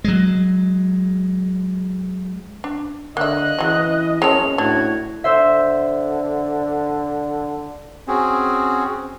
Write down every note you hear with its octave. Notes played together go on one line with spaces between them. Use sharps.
F#3 G#3
D4
D3 A#3 D#5 E5 F#6
C#3 E3 F#3
G#3 A#3 C#4 A4 F7
A2 D4 F#4 G#6
D3 C5 E5
C4 C#4 F#4 G#4